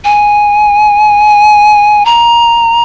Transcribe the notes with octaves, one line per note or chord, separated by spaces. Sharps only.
G#5
A#5